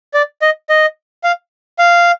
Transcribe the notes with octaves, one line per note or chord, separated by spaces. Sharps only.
D5
D#5
D#5
F5
F5